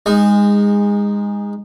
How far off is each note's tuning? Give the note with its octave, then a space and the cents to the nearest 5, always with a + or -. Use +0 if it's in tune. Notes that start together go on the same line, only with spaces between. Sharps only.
G#3 -25 D#4 +0